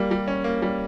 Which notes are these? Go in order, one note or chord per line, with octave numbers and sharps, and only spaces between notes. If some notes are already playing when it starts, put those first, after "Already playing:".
Already playing: G3 A#3
G3
C#4
A#3
G3